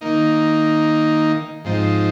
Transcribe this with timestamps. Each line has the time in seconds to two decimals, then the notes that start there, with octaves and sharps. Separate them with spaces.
0.01 D#3 A#3 D#4
1.65 G#2 F3 C4 D#4